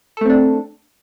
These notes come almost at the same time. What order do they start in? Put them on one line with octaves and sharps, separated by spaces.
A4 A3 C4 D4